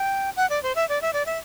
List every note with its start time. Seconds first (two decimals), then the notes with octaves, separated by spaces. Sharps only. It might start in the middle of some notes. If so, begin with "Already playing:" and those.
Already playing: G5
0.36 F#5
0.50 D5
0.63 C5
0.76 E5
0.89 D5
1.02 E5
1.13 D5
1.26 E5